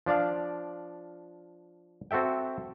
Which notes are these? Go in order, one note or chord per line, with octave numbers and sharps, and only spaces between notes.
F3 D4 D5 F5
C4 F#4 A4 E5 G5